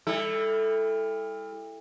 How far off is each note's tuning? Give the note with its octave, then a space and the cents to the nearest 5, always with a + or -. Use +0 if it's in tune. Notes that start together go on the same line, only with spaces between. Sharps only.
G3 +40 E4 +0 A4 +0